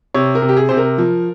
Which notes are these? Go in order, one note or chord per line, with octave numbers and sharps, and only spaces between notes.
C3 C#5
A#4
C3
G4
G#4
C3 C5
A#4
F3